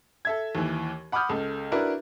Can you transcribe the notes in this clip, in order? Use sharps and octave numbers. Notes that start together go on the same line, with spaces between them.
A4 E5 G#6
D#2 E3
F#5 B5 D6 D#6 F6 G6
C#2 A4
D4 E4 F#4 A#4 B4